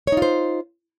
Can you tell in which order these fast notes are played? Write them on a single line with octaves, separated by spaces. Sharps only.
C#5 D#4 F4 C5